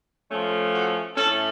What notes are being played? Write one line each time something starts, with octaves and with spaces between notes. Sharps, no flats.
F3 A3 C#4
F#4
A2 A3 C#4 A4